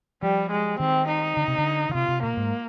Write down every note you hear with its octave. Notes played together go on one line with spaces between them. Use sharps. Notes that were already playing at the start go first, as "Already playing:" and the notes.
F3 G3
G#3
D#3 C4
D#4
D3
C3
D3
D3
C3 F4
C3
A#2 A#3
G#2